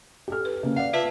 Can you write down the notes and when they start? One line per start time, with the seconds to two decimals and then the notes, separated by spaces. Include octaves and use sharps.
0.28 G4 A4 F6
0.45 B4
0.63 C#3 A#3
0.76 D5 F5 F#5
0.93 F4 B4 E5 A5